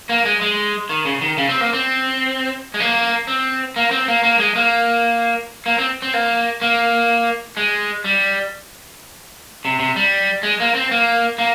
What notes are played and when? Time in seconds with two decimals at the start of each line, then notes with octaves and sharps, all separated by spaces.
0.09 A#3
0.25 G#3
0.41 G#3
0.89 D#3
1.05 C#3
1.21 D#3
1.38 C#3
1.49 C4
1.61 A#3
1.73 C4
2.74 G#3
2.80 A#3
3.27 C4
3.76 A#3
3.91 C4
4.08 A#3
4.23 A#3
4.39 G#3
4.56 A#3
5.66 A#3
5.78 C4
6.02 C4
6.14 A#3
6.61 A#3
7.57 G#3
8.04 G3
9.65 C3
9.80 C3
9.96 G3
10.43 G#3
10.60 A#3
10.75 C4
10.91 A#3
11.38 A#3